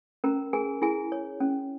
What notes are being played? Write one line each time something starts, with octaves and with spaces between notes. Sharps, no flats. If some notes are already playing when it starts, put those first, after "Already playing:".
C#4 A#4 A#5
G#4 A#4 G#5
E4 G#4 G#5
C#5
C#4